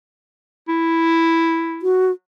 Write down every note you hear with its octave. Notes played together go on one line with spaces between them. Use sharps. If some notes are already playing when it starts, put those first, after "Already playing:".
E4
F#4